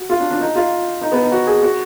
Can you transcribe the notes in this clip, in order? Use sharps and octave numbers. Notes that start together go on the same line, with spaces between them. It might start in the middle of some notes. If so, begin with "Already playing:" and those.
Already playing: F#4
F4
D4
D4
D#4
F4
D#4
B3
D#4
F#4
G#4
F#4